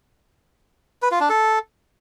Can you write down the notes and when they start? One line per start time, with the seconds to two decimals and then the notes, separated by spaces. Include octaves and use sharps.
1.02 B4
1.11 F4
1.20 D4
1.30 A4